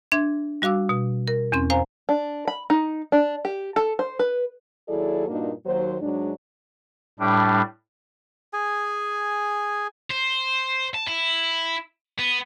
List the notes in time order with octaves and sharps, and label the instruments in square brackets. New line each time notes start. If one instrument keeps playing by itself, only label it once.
[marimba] D4 E5 C6 G#6
G3 F#4 F5 D6 E6
B2
A#4
E2 C4 C#4 C6
C5 F5 G#5 A#5
[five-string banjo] D4
B5
D#4
D4
G4
A4
C5
B4
[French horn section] D#2 F#3 E4 G#4 A4 D5
G2 A#2 A#3 D4 D#4 F#4
D#2 F#3 C5
G#2 F#3 G#3 D4
[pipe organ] A2 G3 D4
[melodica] G#4 G#5
[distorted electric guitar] C5
A5
E4
B3